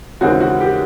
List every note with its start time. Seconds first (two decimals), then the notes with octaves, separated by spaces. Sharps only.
0.21 D#2 C#3 E3 G#3 C4 F#4
0.40 F#4
0.60 G4